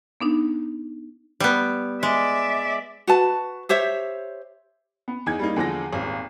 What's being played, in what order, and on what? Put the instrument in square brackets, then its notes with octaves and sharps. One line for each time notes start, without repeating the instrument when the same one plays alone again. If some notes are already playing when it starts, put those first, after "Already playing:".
[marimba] B3 D4 D#4
[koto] G3 B3
[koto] G#3 [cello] D5 E5
[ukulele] F#4 B4 A5
G4 C5 C#5 E5
[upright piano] B3
E2 D#4 G#6
G3 A#3 D#4
E2 D3 F3 A#6
D#1 G#1